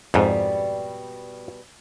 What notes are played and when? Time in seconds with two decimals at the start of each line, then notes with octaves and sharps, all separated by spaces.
0.14 F2 G#2 B2 G3